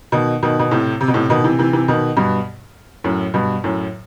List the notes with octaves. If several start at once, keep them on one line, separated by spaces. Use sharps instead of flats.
B2 D#3
B2 D#3
B2
A2 C3
C3
B2
A2 C3
B2 D#3
C3 E3
C3 E3
C3 E3
B2 D#3
G2 B2
F#2 A2
G2 B2
F#2 A2